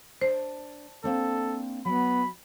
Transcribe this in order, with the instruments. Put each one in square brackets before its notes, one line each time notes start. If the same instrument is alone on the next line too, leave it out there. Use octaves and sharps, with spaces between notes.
[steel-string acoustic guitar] D4 [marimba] C5
[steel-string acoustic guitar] A#3 C4 D4 [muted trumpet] A4
[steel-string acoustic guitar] F#3 [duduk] B3 [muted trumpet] B5